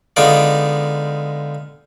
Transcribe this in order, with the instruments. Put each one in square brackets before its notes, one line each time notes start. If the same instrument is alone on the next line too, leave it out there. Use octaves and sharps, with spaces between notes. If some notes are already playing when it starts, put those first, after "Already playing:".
[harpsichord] D3 G#3 B3 D#4 F4 D5